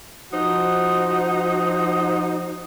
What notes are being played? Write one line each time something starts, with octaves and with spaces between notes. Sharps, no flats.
F3 D#4 F#4 C5